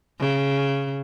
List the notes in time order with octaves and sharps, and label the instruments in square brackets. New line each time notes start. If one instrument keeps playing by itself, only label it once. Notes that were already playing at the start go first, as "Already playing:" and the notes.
[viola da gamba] C#3